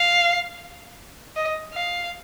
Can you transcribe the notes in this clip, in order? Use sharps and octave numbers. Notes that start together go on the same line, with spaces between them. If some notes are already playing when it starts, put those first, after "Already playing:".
Already playing: F5
D#5
F5